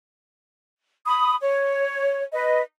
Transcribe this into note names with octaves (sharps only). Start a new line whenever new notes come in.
B5 D#6
C#5
B4 D#5